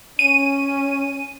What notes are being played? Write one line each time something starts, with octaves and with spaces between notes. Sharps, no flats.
C#4 D#7